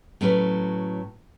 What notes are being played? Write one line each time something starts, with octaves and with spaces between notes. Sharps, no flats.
A2 F#3 C#4 B4